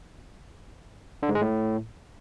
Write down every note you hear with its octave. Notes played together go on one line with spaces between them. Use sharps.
D3
G#2
G#3
A2